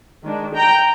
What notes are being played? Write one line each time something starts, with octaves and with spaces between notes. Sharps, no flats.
D#3 G#3 D4
G5 A#5